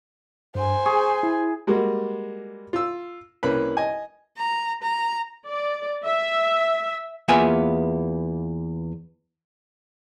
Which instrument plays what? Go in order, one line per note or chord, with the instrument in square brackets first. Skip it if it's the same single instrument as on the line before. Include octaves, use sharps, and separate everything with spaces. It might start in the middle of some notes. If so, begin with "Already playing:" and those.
[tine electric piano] G2 [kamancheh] C5 G#5
[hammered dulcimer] G#4 [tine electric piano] C#6
[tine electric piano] E4
[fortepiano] G3 G#3 A#3 F#4
F4 E6
C2 A#3 C#4 B4 B5
D#5 G#5
[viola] A#5
A#5
[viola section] D5
E5
[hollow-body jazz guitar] E2 A#3 B3 F4 E5 G#5